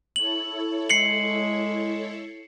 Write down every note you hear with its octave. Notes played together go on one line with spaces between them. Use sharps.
E4 A4 C#5 F#7
G#3 C7 C#7 F#7